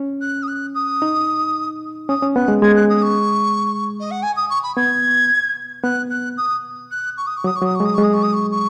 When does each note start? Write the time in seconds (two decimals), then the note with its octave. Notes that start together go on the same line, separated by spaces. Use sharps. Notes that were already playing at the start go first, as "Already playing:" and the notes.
Already playing: C#4
0.21 F#6
0.43 D#6
0.48 F#6
0.75 D#6
1.02 D#4
2.09 C#4 D#6
2.22 C#4
2.36 B3 F#6
2.48 G#3
2.62 G#3 G#6
2.76 F#6
2.89 D#6
3.02 C#6
4.00 D#5
4.11 F#5
4.22 G#5
4.36 D#6
4.49 C#6
4.63 B5
4.76 B3 G#6
5.83 B3 F#6
6.10 F#6
6.37 D#6
6.91 F#6
7.17 C#6
7.27 D#6
7.37 C#6
7.44 F#3 D#6
7.56 C#6
7.61 F#3
7.65 D#6
7.75 C#6
7.80 G#3
7.85 D#6
7.94 G#3 C#6
8.03 D#6
8.13 C#6
8.23 D#6
8.33 C#6
8.51 C#6